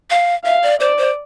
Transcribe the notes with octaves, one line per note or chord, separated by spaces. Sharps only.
F5
E5 F5
D5
C5 D5
C5